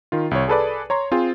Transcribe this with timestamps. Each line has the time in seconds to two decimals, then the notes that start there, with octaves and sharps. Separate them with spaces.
0.12 D#3 F4
0.31 C2 C#5
0.48 G#4 A4 B4 D5
0.90 C#5 A#5 C6
1.11 C4 F4 G#4 C5